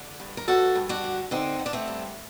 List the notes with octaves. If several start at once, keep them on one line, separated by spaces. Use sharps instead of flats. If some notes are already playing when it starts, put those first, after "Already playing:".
Already playing: D3
G2
A#4
G2 F#4 A4
G2
D4 F#4
D3
D3 C4 D#4
D3
D4
A3 C4
G2